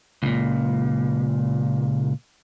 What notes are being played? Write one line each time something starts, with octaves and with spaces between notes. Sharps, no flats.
C#2 A#2